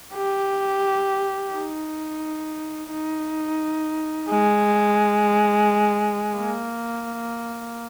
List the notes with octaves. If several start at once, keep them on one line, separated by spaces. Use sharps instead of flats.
G4
D#4
D#4
G#3
A#3